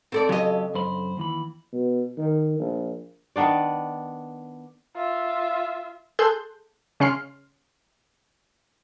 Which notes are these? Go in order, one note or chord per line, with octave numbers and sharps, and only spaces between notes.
C4 A4 D5
C#3 F#3 G4 A4 D#5
F#2 C5 B5
D#2 E3 B5
B2
D#3
A#1
D#3 B3 D4 D5
F4 E5
G#4 A4 C6 F#6 G6
C#3 C#4 C6 F6 C7